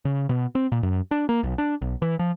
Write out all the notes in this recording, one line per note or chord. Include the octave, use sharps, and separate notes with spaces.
C#3
B2
C4
A#2
F#2
D4
A#3
B1
D4
B1
E3
F3